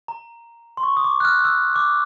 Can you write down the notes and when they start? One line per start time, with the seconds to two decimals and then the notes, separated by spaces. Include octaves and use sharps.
0.08 A#5
0.77 C6
0.83 C#6
0.97 D#6
1.04 D6
1.20 F#6
1.25 F6
1.45 E6
1.76 D6